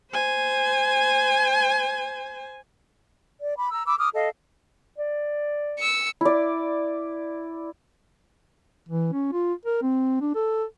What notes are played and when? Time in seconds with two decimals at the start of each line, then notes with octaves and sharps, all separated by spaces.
0.11 C5 G#5
3.40 D5
3.57 B5 D6
3.72 A#5 E6
3.86 B5 D6 E6
3.98 D6 D#6 F6
4.14 A4 D#5 F5
4.98 D5
5.79 E6 C#7
6.21 E4 D5
8.89 E3
9.13 C#4
9.32 F4
9.65 A#4
9.82 C4
10.21 D4
10.35 A4